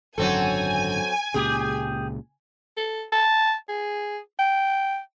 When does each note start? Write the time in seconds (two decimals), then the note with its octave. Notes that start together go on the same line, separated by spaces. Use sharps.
0.18 G#1 F#2 D3 F#3 C4 A4 G#5
1.34 C#2 A#2 C#3 G4 G#4
2.77 A4
3.12 A5
3.69 G#4
4.39 G5